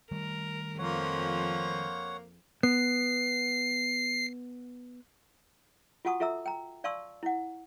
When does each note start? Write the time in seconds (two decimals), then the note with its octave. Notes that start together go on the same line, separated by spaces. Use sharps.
0.11 D#3 G3 A3 A#4
0.79 F2 F3 A#3 C5 C#5 F#5
2.63 B3 C7
6.05 F4 F#4 F#5 A5 C#6 D#6
6.20 F4 A4 E5 A#5 E6
6.46 G5 A#5
6.84 D5 F5 A5 C6 C#6 E6
7.23 E4 F#5